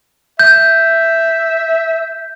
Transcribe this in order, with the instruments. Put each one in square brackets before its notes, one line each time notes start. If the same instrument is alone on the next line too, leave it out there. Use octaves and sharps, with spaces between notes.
[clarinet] E5 [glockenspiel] G6